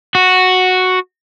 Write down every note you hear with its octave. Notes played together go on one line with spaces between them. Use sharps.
F#4